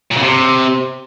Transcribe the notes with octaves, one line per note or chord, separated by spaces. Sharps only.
A#2
C#3
C3